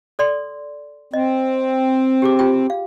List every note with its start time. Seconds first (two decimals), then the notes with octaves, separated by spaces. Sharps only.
0.19 A4 D5 C6
1.13 C4 D#5
2.22 G4 G#4 D6
2.39 F4 G4 G5
2.70 F5